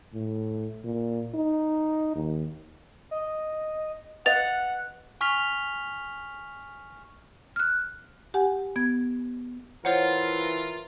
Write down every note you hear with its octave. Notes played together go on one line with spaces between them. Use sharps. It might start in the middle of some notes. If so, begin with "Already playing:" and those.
A2
A#2
D#4
D#2
D#5
B4 D#5 F5 F#5 A6 F7
G#5 C#6 F6 B6 F7 G7
F6 F#6
G4 F#5 G#5
B3 G#6
E3 F4 A#4 C5 C#5 F#5